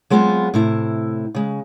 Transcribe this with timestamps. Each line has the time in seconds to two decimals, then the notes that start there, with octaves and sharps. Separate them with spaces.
0.10 F#3 G#3 B3 C4 F4
0.54 A2 C3 E4
1.35 C#3 G#3